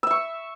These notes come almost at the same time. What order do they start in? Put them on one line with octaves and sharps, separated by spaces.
E6 E5 C#6